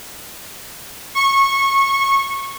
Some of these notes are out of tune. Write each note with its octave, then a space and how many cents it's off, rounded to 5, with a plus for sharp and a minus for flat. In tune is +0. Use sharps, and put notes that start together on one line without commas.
C#6 -20